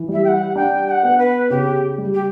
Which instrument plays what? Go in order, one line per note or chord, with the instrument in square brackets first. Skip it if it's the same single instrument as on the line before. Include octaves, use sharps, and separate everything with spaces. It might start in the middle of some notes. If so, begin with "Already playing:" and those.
Already playing: [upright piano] E3
[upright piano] G3 [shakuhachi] E5
[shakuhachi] G5
F#5
[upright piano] D4 [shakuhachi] G5
[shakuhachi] G5
F#5
[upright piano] B3
[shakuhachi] B4
[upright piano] C#3 [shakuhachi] G4
[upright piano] G3
[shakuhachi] G4